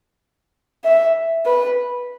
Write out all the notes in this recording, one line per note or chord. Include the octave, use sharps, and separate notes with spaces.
E5
B4